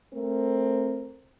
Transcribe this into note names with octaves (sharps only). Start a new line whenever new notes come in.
A3 C4 A#4